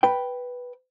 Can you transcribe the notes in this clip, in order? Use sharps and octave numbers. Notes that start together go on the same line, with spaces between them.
B4 G5